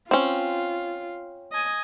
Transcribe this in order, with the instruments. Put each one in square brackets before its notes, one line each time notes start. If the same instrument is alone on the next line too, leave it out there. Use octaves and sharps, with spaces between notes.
[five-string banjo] C4 C#4 [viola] F4
[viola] D#5 G#5